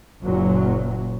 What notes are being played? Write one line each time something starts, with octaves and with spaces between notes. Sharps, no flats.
F#1 A#2 F#3